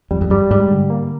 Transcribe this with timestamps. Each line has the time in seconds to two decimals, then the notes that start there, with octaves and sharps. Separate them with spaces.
0.11 F2 G3
0.21 F2
0.30 F#2 G3
0.51 G#2 G3
0.71 D3
0.90 A#3